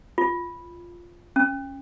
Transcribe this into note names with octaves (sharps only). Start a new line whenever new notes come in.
F4
C#4